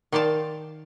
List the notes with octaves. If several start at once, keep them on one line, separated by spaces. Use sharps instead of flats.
D#3 C5 D5 F5 A5